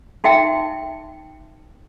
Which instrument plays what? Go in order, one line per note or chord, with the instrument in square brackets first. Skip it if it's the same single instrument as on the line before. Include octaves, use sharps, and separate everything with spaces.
[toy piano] D#4 F#4 E5 G5